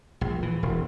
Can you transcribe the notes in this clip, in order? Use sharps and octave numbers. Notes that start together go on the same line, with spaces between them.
A#1
E3
E1